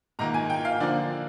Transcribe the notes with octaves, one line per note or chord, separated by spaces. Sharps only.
G#2 D#3 A#3 A#5
G#5
G5
F5
D3 F3 A#3 D4 D5